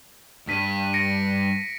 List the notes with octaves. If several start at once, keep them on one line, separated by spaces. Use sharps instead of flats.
G2 B6 D#7
A#6 C#7 D7